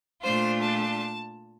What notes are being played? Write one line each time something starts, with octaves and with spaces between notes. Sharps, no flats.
A#2 A3 D4 F4 C5
A5